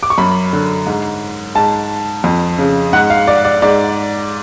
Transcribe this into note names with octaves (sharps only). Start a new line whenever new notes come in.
D6
C#6
F#2 B5
D3
G#2
G#2 A5
F2
C#3
G#2 F#5
F5
D5
D5
G#2 D5